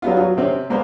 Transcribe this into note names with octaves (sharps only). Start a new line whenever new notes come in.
F#3 G3 B3 F4
F#3
C3 C4 C#4
G#3 A#3 B3 C5